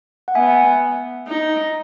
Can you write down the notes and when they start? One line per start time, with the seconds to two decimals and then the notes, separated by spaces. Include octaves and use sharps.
0.28 F#5
0.35 B3 E5 G#5
1.28 D#4